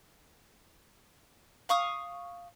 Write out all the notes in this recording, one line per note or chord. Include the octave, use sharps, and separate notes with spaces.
F5 C#6 D#6